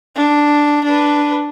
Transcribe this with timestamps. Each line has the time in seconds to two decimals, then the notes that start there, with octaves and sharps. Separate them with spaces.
0.16 D4
0.84 D4 B4